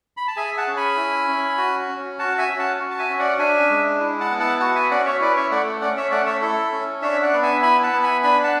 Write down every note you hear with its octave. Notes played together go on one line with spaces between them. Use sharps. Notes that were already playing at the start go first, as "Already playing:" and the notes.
B5
A5
G#4 E5 G#5
F#5 A5
C#4
G#5 B5
E4
C#4
F#4
C#4
F#4 F#5 A5
E5 G#5
C#4
F#5 A5
F#4
A5
E5 G#5
C#4
D5 F#5
D4 E5 G#5
G#3
E4
F#5 A5
B3
F#5 A5
F#4 F#5 A5
E5 G#5
C#4 D5 F#5
C#5 E5
E4 B4 D5
C#5 E5
A3 D5 F#5
C#4 D5 F#5
C#5 E5
A3 D5 F#5
C#5 E5
E4 A4
C#4
D4 C#5 E5
D5 F#5
B3
E5 G#5
E4 G#5 B5
F#5 A5
B3
G#5 B5
D4 G#5 B5
F#5 A5